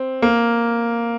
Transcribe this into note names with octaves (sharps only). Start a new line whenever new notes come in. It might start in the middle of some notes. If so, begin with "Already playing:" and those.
Already playing: C4
A#3